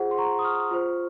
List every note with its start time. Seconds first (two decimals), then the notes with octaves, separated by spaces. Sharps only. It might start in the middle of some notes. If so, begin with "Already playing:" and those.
Already playing: F4 G#4 C5 F#5
0.11 C6
0.18 A#5 C#6
0.39 D#6
0.45 C#6 F6
0.71 F4 C5